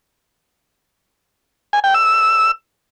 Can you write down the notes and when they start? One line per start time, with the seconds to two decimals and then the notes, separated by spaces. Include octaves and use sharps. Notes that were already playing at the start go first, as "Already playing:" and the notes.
1.73 G#5
1.84 G5
1.94 E6